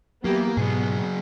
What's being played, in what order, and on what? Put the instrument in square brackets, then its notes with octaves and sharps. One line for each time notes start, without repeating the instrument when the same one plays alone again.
[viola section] E3 B3 G4 [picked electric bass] F#3 [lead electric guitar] A#3
[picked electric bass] G#2 B2 [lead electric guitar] F#3 G#4 [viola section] B3